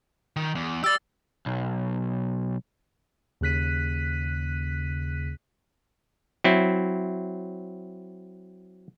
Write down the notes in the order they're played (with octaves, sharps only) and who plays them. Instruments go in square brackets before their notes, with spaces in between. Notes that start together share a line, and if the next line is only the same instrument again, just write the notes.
[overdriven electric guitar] D#3
E2
[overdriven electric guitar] G4 D5 [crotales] E6 A6
[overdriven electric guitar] B1
[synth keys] D#2 C#3 F#6 B6 D#7
[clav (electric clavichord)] F#3 C4 E4